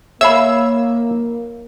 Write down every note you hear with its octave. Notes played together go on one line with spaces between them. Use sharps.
A#3 C#5 E5 F5 B5 E6